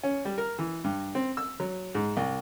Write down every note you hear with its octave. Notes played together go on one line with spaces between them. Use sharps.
C#4
G3
A#4
E3
G2
C4
E6
F#3
G#2
C2